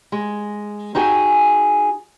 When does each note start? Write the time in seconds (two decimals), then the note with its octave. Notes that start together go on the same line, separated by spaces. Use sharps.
0.12 G#3
0.95 D#4 F#4 G#4 G5 G#5